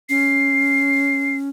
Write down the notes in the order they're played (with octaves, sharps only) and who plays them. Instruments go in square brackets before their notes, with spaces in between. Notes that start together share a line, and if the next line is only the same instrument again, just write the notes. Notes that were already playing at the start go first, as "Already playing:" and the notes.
[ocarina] C#4 [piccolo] C7